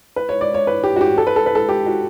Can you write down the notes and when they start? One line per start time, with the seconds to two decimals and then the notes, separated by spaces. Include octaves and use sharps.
0.16 B4
0.29 C#5
0.41 D5
0.54 C#5
0.67 B4
0.84 G4
0.96 F#4
1.01 G4
1.18 A4
1.27 B4
1.36 A4
1.46 B4
1.55 A4
1.69 G4
1.86 F#4